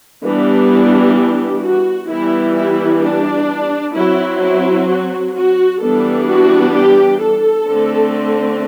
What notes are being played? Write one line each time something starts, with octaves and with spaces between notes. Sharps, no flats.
E3 G3 B3 D4
G4
F#4
E3 G3 B3 E4
E4
D4
F#3 C4 E4
E4
F#4
F#4
E3 G3 B3 D4 A4
F#4
G4
A4
D3 A3 C4